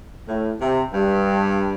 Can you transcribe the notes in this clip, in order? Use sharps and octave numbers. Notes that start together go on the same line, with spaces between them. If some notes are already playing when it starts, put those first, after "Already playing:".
A2
C3
G2